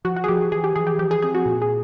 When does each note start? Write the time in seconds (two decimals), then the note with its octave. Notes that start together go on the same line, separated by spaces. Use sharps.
0.05 F3 F#4
0.16 F#4
0.24 G#4
0.28 F3 G4
0.52 E3 G#4
0.64 G4
0.76 E3 G#4
0.87 G4
0.99 F3 G4
1.11 G#4
1.23 C4 G#4
1.34 F#4
1.46 A#2
1.62 G#4